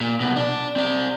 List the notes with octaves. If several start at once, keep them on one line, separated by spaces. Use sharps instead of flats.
A#2
C2 B2
D4 D5
C4 D5